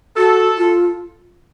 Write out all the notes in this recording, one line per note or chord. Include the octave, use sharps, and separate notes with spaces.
F#4 A4
F4